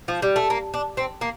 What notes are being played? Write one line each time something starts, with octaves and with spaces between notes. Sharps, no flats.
F3
G3
A3
A#3
D4
C4
A#3